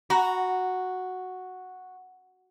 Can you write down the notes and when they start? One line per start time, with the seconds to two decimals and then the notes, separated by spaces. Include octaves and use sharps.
0.10 F#4 A#5 B5